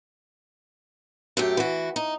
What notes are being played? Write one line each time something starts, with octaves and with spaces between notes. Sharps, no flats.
F#2 A3 G4
E3 F#4
D#4